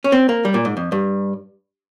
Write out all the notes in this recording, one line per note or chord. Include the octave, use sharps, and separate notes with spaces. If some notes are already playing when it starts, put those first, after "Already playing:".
C#4
C4
A#3
G3
A#2
G#2
F2
G2